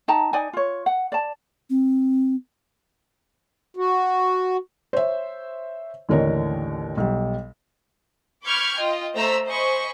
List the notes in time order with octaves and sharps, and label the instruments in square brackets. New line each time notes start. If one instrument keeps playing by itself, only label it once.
[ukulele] D#4 G5 A5 A#5
D#4 D5 G#5
F4 C#5
F#5
D5 A5
[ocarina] C4
[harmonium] F#4
[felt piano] C5 C#5 E5
A1 D#2 D3 A#4 C#5 D#5
B1 G3
[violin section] B5 C#6 D6 F6 G6 G#6
F4 D#5 G5
A3 C5 A#5 E6 B6
C5 D#5 G#5 B5 C#6